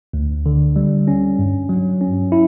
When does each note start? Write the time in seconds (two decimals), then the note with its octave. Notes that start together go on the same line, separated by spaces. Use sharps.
0.13 D2
0.46 D3
0.76 G3
1.08 C#4
1.39 G2
1.69 F#3
2.01 C#4
2.32 E4